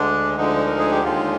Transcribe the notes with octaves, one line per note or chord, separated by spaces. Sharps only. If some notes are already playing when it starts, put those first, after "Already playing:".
Already playing: D2 D3 G#3 D4
D2 D3 F3 G#3 D#4
A#4
G#4
G4
D#2 D3 G#3 F4